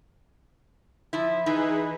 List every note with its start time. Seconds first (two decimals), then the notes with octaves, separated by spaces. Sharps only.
1.13 F3 E4
1.46 E3 D#4 G#4 B4